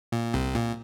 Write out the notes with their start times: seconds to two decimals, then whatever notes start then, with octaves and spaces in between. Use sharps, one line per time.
0.12 A#2
0.34 C2 C3
0.55 A#2